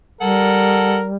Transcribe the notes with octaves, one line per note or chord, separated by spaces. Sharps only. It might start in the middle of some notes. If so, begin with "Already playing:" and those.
G3 A4 A#4 F#5